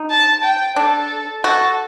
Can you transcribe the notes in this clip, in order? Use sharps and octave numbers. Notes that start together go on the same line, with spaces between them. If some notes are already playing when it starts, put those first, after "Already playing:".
Already playing: D#4
A5
G5
D4 A4
F#4 A4